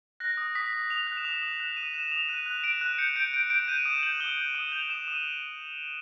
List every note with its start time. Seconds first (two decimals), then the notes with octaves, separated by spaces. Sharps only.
0.20 F#6 A#6
0.37 D#6
0.55 D#6 B6
0.73 D#6
0.90 D#6 F7
1.07 F#6 F7
1.17 E7
1.25 D#6 F7
1.42 D#6 F#7
1.60 F#6 E7
1.76 D#6 D#7
1.94 F#6 E7
2.11 D#6 F7
2.29 F#6 D#7
2.46 F#6
2.64 F#6 D7
2.81 F#6
2.98 G6 C#7
3.16 G6 D7
3.33 G6 D7
3.50 G6 D7
3.68 G6 D#7
3.85 D#6 E7
4.03 G6 F#7
4.20 D#6 G7
4.37 G6 F#7
4.55 D#6 F#7
4.72 G6 F7
4.90 D#6 E7
5.07 D#6 D#7